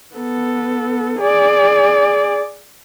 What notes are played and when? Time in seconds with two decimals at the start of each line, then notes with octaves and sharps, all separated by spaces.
0.15 B3 A4
1.19 G#4 D5